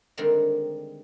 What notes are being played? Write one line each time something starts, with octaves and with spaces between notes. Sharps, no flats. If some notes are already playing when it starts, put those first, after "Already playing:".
D3 D#3 G3 G#3 C4 A#4